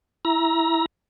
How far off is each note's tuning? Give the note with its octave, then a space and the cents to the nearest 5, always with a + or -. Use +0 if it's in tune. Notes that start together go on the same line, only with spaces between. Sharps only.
E4 +0 A#5 +25